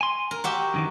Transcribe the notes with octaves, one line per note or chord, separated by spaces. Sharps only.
G#5 C6
A#4
F#4 G4 E5
F#2 D#3 E3